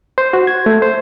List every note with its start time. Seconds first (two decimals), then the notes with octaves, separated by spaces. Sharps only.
0.18 C5
0.33 F#4
0.47 G#6
0.66 A3
0.82 C5